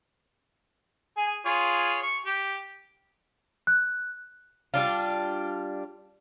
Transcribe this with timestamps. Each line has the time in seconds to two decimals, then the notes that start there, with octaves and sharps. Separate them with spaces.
1.17 G#4 G#5
1.45 F4 G#4 C#5
2.03 C#6
2.25 G4
3.67 F#6
4.74 G3 D4 F4